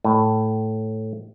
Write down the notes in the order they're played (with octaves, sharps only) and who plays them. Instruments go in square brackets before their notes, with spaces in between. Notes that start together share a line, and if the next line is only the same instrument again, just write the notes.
[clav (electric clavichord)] A2